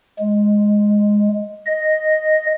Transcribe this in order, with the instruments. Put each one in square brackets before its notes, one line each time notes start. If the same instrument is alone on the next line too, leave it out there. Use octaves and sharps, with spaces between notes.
[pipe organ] G#3
D#5